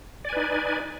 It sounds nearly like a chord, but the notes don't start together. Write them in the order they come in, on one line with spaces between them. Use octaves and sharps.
D5 G#5 B4 D#4